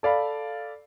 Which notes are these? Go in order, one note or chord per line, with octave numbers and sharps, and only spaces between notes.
A4 D5 F5 B5